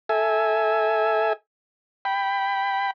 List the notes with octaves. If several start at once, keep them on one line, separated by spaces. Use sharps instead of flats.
A4 E5 G#5
G5 B5